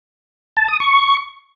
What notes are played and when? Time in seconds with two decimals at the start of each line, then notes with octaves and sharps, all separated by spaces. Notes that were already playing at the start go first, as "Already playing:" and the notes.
0.57 A5
0.68 D#6
0.80 C#6